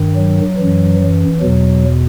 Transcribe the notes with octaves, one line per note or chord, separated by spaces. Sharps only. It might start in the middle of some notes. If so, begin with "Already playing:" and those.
Already playing: G2 D#3
F#3
F#2 E3
E3
E2 B2 F#3